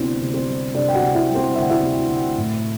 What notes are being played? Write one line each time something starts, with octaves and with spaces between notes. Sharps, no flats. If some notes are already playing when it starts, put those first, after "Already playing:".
Already playing: D2 C3 B3 C4 D4 E4 C5 D5
C3
C4 C5
G3
C3 D4 D5
G5
F#4 F#5
C3
E4 E5
G3
C4 C5
D2 E5
F#5
E4 E5
C3
C3
A2